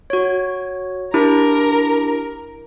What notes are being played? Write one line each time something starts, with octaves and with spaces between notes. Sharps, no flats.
F#4 C#5
D4 E4 G4 A#4